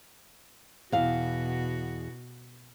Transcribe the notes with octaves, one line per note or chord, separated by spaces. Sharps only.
E2 B2 F#4 F5